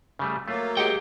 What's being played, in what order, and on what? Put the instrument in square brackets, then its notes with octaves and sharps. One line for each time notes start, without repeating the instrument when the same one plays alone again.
[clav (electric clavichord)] C#3 G3 A3
[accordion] F#3 A#3 [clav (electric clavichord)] A3 F4
[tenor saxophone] G#3 [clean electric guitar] G4 F#5 G5